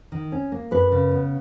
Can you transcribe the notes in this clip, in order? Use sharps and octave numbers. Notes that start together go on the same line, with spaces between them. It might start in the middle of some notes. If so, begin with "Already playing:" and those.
D#3
C#4
A#3
F#2 B4
C#3
B3